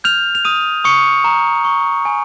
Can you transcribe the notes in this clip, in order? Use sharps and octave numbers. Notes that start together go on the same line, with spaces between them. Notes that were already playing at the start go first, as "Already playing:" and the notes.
F6 G6 F7
F7
D#6 D#7
C#6 D#6 C#7
A#5
C#6
G#5